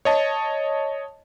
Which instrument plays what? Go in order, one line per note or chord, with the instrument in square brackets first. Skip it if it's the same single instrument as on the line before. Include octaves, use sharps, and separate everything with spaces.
[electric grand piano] C#5 D#5 A5